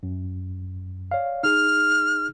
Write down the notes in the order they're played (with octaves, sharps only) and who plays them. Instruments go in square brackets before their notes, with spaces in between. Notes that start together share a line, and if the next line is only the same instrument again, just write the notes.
[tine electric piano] F#2
C#5 D5 F5
[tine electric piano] D#4 G#4 [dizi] F6